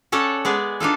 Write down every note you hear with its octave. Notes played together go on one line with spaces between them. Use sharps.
C#4 A4 C#5 D5 F#5
G#3 B3 G#4 D5
D4 D#4 F4 A4